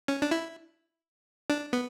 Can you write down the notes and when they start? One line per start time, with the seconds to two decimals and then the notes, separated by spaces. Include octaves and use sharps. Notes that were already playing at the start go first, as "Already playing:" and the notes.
0.08 C#4
0.22 D4
0.31 E4
1.50 D4
1.73 B3